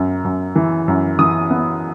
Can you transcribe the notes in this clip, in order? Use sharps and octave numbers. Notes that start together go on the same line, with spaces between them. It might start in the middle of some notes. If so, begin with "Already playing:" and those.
Already playing: F#2
F#2
E3
F#2
E3 D#6
B3